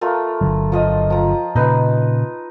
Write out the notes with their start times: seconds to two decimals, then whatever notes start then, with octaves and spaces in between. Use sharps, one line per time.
0.01 A3 F4 A#4
0.41 G1 D3 F#3
0.72 F3 F4 D#5
1.10 F3 A#5
1.56 A#2 C#3 D#4 B4